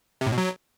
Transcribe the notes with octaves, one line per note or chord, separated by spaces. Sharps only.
C3
A2
B2
F#3